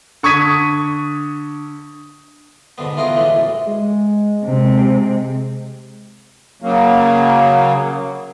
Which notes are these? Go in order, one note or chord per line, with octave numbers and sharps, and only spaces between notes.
D3 C#6 D#6 G#6 B6 D#7
G#2 B2 D3 B3
E3 A3 F4 F#4 G#4 A#4
A2 E3 G#3 A3 D4
C#2 F#2
G#3
C3
C#3 F#3 A#3